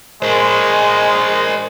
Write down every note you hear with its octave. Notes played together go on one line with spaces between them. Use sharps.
G#3 A#4 C5